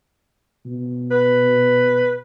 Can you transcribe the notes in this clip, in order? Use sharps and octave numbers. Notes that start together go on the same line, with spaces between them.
B2
B4